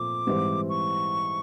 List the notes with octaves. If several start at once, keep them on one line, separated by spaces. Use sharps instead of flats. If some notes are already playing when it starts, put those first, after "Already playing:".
Already playing: A#2 F3 A3 C4 D6
G#2 E3 G3 C4
C#6